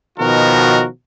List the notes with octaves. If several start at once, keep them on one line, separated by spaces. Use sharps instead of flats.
B2 D#3 F3 F#4 A#4